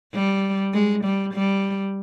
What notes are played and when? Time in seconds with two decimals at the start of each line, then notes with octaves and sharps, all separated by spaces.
0.14 G3
0.74 G#3
1.04 G3
1.34 G3